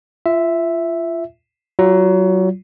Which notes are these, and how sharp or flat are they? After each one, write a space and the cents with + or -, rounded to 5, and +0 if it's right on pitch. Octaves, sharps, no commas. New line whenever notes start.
F4 -30 E5 +0
F#3 +25 F4 +0